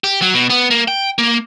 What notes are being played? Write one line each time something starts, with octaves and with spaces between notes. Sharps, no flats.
G4
F#3
B2
B3
A#3
G5
A#3